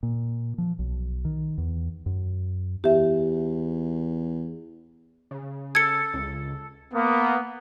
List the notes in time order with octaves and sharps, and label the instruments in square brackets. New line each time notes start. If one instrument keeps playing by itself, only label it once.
[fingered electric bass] A#2
F3
B1
D#3
E2
F#2
[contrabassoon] E2 [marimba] G4 E5
[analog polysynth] C#3
[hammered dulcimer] A4 [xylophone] G#6 C#7
[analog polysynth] C#2
[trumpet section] A#3 B3